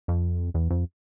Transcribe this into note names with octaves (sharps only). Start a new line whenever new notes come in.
F2
E2
F2